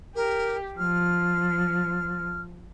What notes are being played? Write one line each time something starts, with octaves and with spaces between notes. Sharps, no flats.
G4 A#4
F3 F6